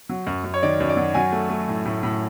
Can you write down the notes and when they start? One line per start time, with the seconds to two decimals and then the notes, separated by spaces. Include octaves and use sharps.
0.09 F#3
0.27 F#2
0.44 F#2
0.54 C#5
0.63 D#3 D5
0.80 F#2
0.89 D5
0.97 F#3
1.14 F#3 G#5
1.32 A3
1.50 A3
1.68 A2
1.86 A2
2.03 A2